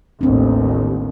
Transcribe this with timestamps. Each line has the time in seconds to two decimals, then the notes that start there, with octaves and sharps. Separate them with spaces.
0.21 A1 D#2 C4 D4